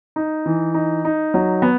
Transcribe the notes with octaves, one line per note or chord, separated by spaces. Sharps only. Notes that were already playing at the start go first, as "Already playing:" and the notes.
D#4
E3
D#4
D#4
F#3
B3